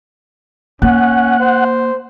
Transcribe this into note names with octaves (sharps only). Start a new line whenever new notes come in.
A#3 C#4 F#5
C5